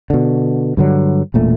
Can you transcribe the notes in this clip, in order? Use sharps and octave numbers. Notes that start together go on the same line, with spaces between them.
B2 D3
G2 D3 F#3
E1 A#2 A3